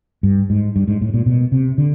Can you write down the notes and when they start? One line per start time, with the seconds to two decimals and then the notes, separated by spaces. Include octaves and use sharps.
0.23 G2
0.50 G#2
0.76 G2
0.88 G#2
1.01 A2
1.14 A#2
1.26 B2
1.52 C3
1.78 D3